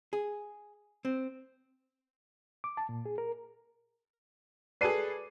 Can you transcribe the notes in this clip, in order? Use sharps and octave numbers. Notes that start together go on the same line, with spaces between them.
G#4
C4
D6
A5
A#2
G#4
A#4
G#4 A4 B4 D5 C7 D#7